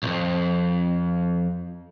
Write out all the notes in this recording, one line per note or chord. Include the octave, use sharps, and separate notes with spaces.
B1 F2